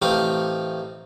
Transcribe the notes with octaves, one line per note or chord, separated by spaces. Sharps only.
A1 A3 C4 D#4 F5 D6